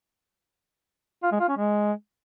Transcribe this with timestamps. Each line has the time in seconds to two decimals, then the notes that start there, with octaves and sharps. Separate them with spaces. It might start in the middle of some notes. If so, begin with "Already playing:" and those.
1.23 F4
1.32 G#3
1.40 F4
1.48 C#4
1.57 G#3